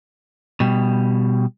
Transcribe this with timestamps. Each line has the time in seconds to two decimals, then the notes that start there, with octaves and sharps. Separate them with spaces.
0.60 B2 G3